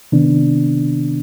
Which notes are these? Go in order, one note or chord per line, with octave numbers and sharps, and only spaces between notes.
C3 D#3 B3 D4